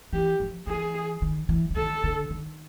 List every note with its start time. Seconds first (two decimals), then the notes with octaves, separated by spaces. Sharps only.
0.13 E3 G4
0.40 F3
0.67 E3 G#4
1.22 D#3
1.49 E3
1.71 D3
1.76 D#3 A4
2.04 D3
2.30 D#3